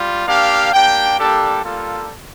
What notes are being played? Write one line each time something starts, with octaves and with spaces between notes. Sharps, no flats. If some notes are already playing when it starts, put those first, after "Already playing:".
Already playing: G3 F4
A#3 D4 G4 F5
A#3 D4 G4 G5
G3 A#3 D4 G4 A4
G3 A#3 F4 A4